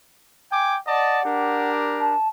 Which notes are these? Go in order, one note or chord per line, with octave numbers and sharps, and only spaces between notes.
G5 G#5 D6
D5 D#5 F#5 A5
D4 G4 A#4
A5